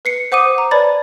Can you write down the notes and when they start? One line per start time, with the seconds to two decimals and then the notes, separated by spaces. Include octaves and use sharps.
0.05 B4 C7 C#7
0.32 C5 F#5 D6 D#6 D#7
0.58 A#5
0.71 B4 C#5 D5 A5 B5 A6